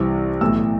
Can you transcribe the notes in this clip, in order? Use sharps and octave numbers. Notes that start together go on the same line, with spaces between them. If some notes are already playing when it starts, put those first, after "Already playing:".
Already playing: C2 C3 E3
B1 A2 E3 A3 E6